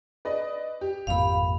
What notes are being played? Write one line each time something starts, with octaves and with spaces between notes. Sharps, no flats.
B4 D5 D#5
G4
G#1 F2 A#2 F5 B5